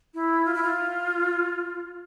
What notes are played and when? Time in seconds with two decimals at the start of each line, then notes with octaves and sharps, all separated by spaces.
0.14 E4
0.45 F4
0.54 E4
0.63 F4